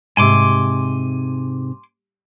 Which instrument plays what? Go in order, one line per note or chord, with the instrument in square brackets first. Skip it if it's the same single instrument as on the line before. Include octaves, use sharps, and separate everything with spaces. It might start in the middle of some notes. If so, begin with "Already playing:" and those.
[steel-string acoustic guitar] G#2 C3 [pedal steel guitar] G#5 C6 D6